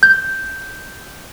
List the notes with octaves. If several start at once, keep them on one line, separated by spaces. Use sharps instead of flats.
G6